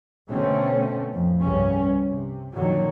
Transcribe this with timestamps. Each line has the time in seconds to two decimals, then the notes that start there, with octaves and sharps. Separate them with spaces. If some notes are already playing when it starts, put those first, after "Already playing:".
0.29 B2 D3 A3 C4 C#4
1.12 F2 A2
1.42 C2 G2 C#3 G3 C#4
2.07 C3
2.55 F#2 A#2 D3 D#3 F#3